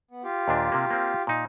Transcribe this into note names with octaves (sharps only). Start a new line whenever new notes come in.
B3
F4 G4
D#2 A#2 D4
C3 A#3
A#3 C4
A#2 D#4